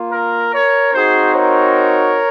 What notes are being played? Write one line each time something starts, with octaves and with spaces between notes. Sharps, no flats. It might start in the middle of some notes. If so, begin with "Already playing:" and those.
Already playing: A#3 F4
A#4
A#4 C#5
C4 D#4 F#4 G#4 C5
A#4 C#5